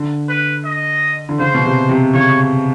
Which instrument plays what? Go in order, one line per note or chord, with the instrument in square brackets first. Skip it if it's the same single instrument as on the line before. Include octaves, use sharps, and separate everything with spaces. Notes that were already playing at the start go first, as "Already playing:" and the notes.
Already playing: [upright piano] D3
[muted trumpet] B4
D#5
[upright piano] D3
[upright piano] C#3 [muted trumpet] C5
[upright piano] B2
C3
C3
[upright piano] C#3 [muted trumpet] C#5